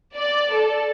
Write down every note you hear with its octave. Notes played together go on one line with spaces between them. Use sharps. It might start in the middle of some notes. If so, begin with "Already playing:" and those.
D5
A4